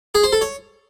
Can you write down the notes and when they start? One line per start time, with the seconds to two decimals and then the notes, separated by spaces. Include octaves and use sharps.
0.15 G#4
0.24 C5
0.32 A4
0.41 C#5